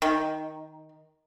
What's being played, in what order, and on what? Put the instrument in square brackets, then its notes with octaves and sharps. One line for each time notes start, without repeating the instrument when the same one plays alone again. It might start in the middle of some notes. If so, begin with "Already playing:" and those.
[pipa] D#3